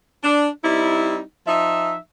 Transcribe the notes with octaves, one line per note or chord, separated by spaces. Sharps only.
D4
G3 C4 D#4 E4
F3 D#4 E5